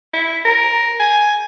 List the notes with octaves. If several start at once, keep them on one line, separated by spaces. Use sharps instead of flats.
E4
A#4
G#5